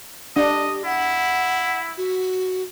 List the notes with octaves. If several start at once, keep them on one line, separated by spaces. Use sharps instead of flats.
D4 G4 D#5
E4 F#5
F#4